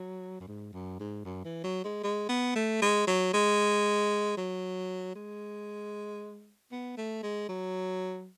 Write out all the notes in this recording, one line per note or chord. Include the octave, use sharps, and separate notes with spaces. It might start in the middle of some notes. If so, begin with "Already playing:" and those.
Already playing: F#3
F#2
G#2
F#2
G#2
F#2
E3
F#3
G#3
G#3
B3
A3
G#3
F#3
G#3
F#3
G#3
B3
A3
G#3
F#3